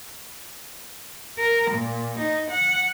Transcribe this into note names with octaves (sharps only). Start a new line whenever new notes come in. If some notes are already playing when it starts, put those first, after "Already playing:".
A#4
A#2
D#4
F#5